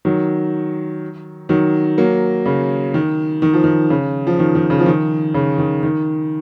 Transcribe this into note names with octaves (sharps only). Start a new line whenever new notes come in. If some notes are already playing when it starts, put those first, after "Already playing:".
D#3 F#3
D#3 F#3
F#3 A#3
C#3
D#3
D#3
F3
D#3
C#3
F3
D#3
D#3
C#3
F3
D#3
C#3
D#3
D#3